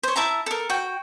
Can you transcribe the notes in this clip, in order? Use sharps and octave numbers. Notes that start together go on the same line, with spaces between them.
C5 C#5
E4 E5 A5 A#5
A4 A#4
F#4 G5